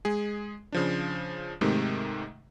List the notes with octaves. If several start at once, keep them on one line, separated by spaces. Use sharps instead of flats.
G#3 G#4
C#3 F3 D4
G#2 C3 D#3 G#3 A3